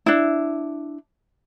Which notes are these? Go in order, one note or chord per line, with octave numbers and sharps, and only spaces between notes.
D4 E4